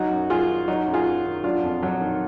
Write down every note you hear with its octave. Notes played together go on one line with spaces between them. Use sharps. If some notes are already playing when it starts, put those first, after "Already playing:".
Already playing: F#3 D#4 F#4
F#2
F#2 F4 G#4
D#3
F#3 D#4 F#4
F#2
F4 G#4
F#2
D#3
F#3 D4 F4
F2
F2 F#3
D#3